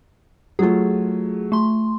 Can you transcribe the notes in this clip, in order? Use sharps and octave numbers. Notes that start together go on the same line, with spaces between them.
F#3 A3 F4 G#4
A3 C6